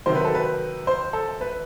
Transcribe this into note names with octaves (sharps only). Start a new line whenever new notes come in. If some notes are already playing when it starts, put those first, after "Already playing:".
C3 D#3 F#3 C5
B4
A4
B4
C5
A4
B4